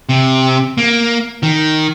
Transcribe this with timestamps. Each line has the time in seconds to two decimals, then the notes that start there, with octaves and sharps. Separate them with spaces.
0.09 C3
0.78 A#3
1.43 D#3